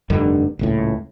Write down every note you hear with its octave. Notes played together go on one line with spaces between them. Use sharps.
F1 G2 D3 D#3
D#1 C#2 A2